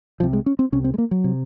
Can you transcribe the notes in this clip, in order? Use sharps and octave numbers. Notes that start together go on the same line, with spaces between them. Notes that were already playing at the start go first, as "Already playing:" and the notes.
C2 C3 F3
G#3
C#4
C4
C2 C3 C#4
C4
G#3
A#3
F#3
C3